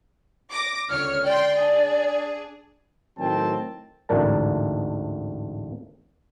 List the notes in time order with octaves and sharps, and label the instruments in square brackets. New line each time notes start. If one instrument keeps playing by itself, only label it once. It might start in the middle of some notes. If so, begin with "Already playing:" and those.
[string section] D6 A#6
[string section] C#2 D3 C#5 [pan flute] F6
[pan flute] D5 [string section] G5 C6
[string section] D4 G#4
[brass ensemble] A2 D#3 F#3 C4 G5 A5
[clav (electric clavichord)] A1 D2 G#2 D4 A#4 A5